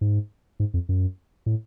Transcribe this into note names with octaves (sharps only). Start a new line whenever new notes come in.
G#2
G#2
F2
F#2
A2